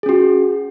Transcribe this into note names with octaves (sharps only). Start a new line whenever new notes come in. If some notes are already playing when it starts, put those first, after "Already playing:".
C#4 F#4 G#4